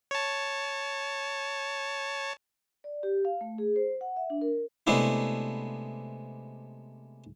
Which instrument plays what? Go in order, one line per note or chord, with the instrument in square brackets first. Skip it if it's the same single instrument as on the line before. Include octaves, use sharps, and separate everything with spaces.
[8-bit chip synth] C#5 A5
[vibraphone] D5
G4
F5
A3
G#4
C5
F#5
E5
D4
A#4
[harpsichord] C3 G#3 A3 B3 D4 E4